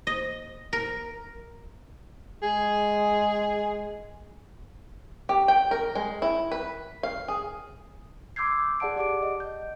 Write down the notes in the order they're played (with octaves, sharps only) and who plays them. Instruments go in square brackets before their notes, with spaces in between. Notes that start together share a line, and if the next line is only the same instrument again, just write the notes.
[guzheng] D#5
A#4
[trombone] G#3 [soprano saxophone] G#4
[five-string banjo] G4
G5
A#4
G#3
E4
B4
F5
G#4
[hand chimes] C6 D6 E6 G6 G#6 C7
G#4 D5 F#5 A5 D7
G4 D5 F#5 D6 D7
D#5
G6